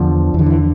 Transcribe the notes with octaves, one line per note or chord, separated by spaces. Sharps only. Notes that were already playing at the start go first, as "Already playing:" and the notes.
Already playing: E2 D3 F3
E2 E3
D3
E3